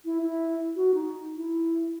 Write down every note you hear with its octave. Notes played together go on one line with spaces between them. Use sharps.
E4
E4
F#4
D#4
E4